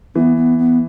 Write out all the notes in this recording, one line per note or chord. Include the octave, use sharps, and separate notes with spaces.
E3 B3
B3
B3